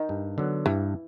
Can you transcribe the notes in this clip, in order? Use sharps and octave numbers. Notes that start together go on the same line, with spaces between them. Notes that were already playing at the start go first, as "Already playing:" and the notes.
Already playing: D#3
G2
D3 F#3 B3
G2 E3